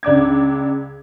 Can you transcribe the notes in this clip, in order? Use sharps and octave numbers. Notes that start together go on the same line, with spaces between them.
C#2 D4 D6 G#6